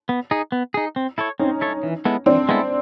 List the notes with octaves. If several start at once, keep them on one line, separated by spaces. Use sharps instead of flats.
B3
D#4 G#4
B3
D#4 G#4
C4
E4 A4 C#5
C4 C#4 D#4
E4 A4 C#5
E3
G#3 B3 E4 A4
E3 C4 D4
G#3 B3 E4 A4